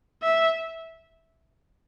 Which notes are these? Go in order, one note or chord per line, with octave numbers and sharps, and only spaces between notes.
E5